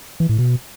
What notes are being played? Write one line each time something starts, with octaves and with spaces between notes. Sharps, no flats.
E3
A2
B2